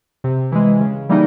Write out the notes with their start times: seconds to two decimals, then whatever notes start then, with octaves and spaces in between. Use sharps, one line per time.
0.24 C3
0.52 E3 G#3
0.80 C#3
1.09 E3 G3 A#3 D#4